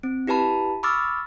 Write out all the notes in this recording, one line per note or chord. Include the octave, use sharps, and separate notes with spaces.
C4
E4 G4 B4 A5 B5
B5 C#6 D6 E6 F6 A6